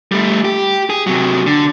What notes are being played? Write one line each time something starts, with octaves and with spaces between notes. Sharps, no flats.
G3 A3
G4
G#4
C3 F#3
D3